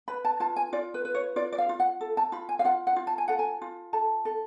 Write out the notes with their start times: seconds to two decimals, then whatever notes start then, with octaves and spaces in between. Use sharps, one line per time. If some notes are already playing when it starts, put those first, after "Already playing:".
0.08 B4 B5
0.25 A5
0.40 F4 A5
0.56 G#5
0.73 F4 D5
0.94 B4
1.05 B4
1.15 C#5
1.36 F4 D5
1.52 D5
1.58 F5
1.69 F4
1.80 F#5
2.01 A4
2.17 A5
2.32 F4 B5
2.49 G#5
2.59 F5
2.65 F4 F#5
2.87 F#5
2.96 F4
3.07 A5
3.18 G#5
3.28 A4 F#5
3.39 G#5
3.62 F4
3.93 A4 A5
4.25 A4